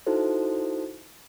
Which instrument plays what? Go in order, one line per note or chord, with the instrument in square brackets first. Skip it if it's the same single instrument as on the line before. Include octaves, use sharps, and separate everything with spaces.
[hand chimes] D#4 E4 F#4 A4 C5